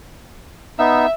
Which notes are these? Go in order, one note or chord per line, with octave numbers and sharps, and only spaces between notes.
B3 D#4 E5